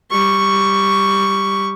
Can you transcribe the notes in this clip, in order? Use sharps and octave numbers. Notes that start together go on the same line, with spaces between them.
G3 C#6